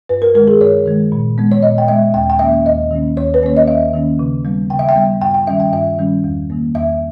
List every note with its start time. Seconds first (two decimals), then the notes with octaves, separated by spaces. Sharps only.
0.09 G2 B4
0.22 A#4
0.34 D#3 G#3 A#4
0.48 G#4
0.61 G2 C#5
0.86 D#3 G#3
1.12 A#2
1.38 G#3 B3
1.52 C#5
1.62 A#2 D#5
1.78 G5
1.88 G#3 B3 E5
2.14 D#2 G5
2.30 G5
2.39 D#3 A#3 C#4 E5
2.66 D#2 D#5
2.91 D#3 A#3 C#4
3.17 D#2 C#5
3.34 B4
3.42 D#3 A#3 C#4 C#5
3.57 D#5
3.67 D#2 E5
3.93 D#3 A#3 C#4
4.19 C#3
4.45 G3 B3
4.70 C#3 G5
4.79 E5
4.89 G5
4.96 G3 B3
5.21 G2 G5
5.34 G5
5.47 D#3 G3 C#4 E5
5.60 G5
5.72 G2 E5
5.99 D#3 G3 C#4
6.24 E2
6.50 D#3 A#3
6.75 E2 E5